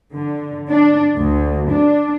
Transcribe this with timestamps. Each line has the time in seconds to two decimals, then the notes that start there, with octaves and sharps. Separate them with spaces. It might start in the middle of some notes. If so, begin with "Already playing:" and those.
0.14 D3
0.69 D4
1.16 D2
1.70 D4